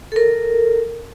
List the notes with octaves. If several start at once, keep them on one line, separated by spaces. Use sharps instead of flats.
A4 A#4